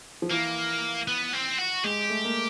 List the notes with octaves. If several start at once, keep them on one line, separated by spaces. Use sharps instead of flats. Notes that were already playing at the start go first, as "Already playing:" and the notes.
F3
E3 A#3
B3
C4
F#4
G#3 G4
A3
A#3